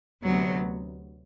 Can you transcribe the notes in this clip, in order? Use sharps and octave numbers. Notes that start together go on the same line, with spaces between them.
D2 C3 F#3 B3